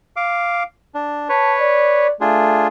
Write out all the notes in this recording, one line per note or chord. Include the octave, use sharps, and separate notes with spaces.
F5 D6
D4
B4 C#5 A5
D5
A3 D4 F4 G#4